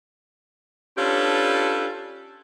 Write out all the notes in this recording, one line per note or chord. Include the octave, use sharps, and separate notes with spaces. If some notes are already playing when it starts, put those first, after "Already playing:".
C#4 D4 F4 G4 A4 B4